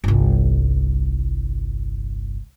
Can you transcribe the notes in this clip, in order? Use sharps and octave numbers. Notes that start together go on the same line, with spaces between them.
G1 C2